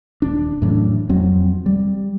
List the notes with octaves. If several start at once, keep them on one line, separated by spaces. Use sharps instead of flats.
D#1 D4
F#2 A2 E3 D4
F2 F#3 C4
G3